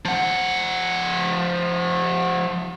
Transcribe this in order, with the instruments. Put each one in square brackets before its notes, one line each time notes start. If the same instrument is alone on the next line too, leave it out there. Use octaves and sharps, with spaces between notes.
[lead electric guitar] F3 F#5